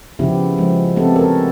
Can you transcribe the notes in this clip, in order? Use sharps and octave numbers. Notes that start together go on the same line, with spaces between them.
C#3 F3 B3 E4 G4
F3 G#3
A3 B3 C4 G4 A4
F#4 A4 A#4 C#5